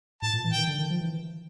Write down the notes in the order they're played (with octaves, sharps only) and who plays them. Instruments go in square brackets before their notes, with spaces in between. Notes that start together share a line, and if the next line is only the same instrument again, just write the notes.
[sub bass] A2 [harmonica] A5
[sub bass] A#2
E3
[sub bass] D#3 [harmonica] G5
[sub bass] D3
D#3
F3
E3